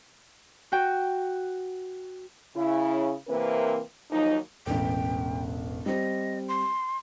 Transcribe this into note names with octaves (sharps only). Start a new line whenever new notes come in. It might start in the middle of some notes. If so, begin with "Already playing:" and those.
F#4 G5
C#3 E4
C3 E3 A#3 C4 A#4 B4
D#2 F3 F#3 D#4
E1 A1 G5
G3 C4 D#5
C6